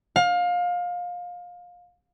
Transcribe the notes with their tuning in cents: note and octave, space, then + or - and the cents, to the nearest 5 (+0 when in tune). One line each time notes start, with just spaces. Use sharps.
F5 +25